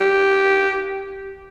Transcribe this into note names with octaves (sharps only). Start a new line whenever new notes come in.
G4